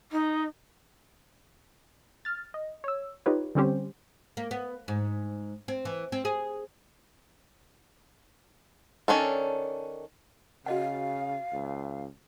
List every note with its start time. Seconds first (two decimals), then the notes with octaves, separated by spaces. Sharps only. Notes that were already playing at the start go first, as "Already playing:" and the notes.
0.11 D#4
2.25 F6 A6
2.54 D#5
2.84 C#5 E6
3.26 D#4 F4 G4 B4 C#5
3.55 D3 G3 C4 C#4 G4 C5
4.37 A#3
4.51 B3
4.88 G#2
5.68 C4
5.85 E3
6.12 C4
6.25 G#4
9.08 D#3 C#4 D4 A4
10.66 C#3 F#4 D#5 F5 F#5
11.53 C#2